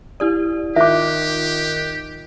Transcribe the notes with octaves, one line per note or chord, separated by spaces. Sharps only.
E4 G4 D5
D#3 F4 G4 E5 D6 F#6